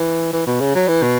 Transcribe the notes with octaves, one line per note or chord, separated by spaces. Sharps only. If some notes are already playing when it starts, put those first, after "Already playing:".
Already playing: E3
E3
B2
C#3
F#3
E3
B2